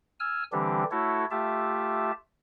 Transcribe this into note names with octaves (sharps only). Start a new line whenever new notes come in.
G#5 E6 F6
D3 E3 G3 C4 D4 G4
A3 E4 F#4 A4 C#5
A3 F4 G4 E5 A5